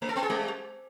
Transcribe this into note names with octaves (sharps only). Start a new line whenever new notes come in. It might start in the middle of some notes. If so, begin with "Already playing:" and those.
A3
A4
B3
G#4
G3